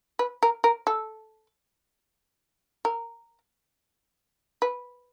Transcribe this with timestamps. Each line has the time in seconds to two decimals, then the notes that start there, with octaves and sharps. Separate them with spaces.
0.19 B4
0.43 A#4
0.64 A#4
0.87 A4
2.85 A#4
4.62 B4